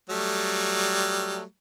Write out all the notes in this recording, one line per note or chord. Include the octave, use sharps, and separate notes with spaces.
F#3 G3 A3